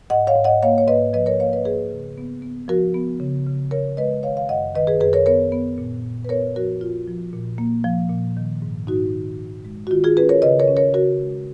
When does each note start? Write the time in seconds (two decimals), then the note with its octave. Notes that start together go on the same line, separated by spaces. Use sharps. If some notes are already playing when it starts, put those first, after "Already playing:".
0.10 G#2 D#5 F#5
0.27 C#5 F5
0.36 G#2
0.44 D#5 F#5
0.62 A#3 C#5 F5
0.78 C#5
0.87 G#2 B4 D#5
1.13 F3 B4 D#5
1.26 A#4 C#5
1.40 A#3 C#5 F5
1.53 B4 D#5
1.65 A#3 G#4 B4
1.91 C#3
2.18 B3
2.42 B3
2.68 F3 F#4 A#4
2.94 B3
3.20 C#3
3.47 C#3
3.71 C#3 A#4 C#5
3.97 G#3 B4 D#5
4.23 D#3 C#5 F5
4.37 F5
4.49 F#2 D#5 F#5
4.75 D#3 B4 D#5
4.87 G#4 B4
5.01 F#2 G#4 B4
5.13 A#4 C#5
5.26 B3 A#4 C#5
5.52 B3
5.78 A#2
6.03 A#2
6.25 B4
6.29 B3 A#4 C#5
6.56 F3 F#4 A#4
6.81 A#2 F4
7.08 F3
7.33 A#2
7.58 A#3
7.84 F3
8.10 A#2
8.37 D#3
8.62 G#2
8.87 G#2 D#4 F#4
9.13 D#3
9.40 G#2
9.65 G#3
9.87 F#4
9.91 D#3 F4
10.04 F4 G#4
10.17 C#4 G#4 B4
10.29 A#4 C#5
10.42 C#3 B4 D#5
10.60 A#4 C#5
10.68 C#4
10.77 A#4 C#5
10.94 C#3 F#4 A#4
11.20 G#3